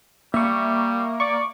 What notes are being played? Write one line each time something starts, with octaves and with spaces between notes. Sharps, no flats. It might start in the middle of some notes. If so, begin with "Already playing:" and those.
G3 A#3 E5 C#6
D5 C#6 D6